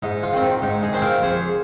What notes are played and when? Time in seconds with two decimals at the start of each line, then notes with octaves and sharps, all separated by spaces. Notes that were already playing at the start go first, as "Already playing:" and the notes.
0.03 G#2 D#4
0.23 F4
0.33 D#3 C4
0.43 D#4
0.62 G#2 D#4
0.82 D#4 G#4
0.93 D#3 C4 C5
1.02 F4 A#4
1.23 F2 G#4 C5